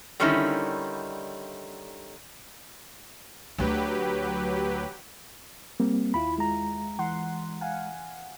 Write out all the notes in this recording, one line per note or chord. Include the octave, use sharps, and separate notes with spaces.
D3 D#3 G3 C#4 D#4 E4
D2 F#3 A3 G4 B4
G3 A#3 C4
D#2 E4 F4 B5
G#3 A#5
E3 F#5 C6
F5 F#5 G#5